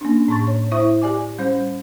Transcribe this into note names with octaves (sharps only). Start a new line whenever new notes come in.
A#3 C#4 D4
A2 A5 C6 C#6 A6
C#5
E4 C5 E5 C#6 D#6
G4 D5 G#5 D6
G3 C#4 C5 G6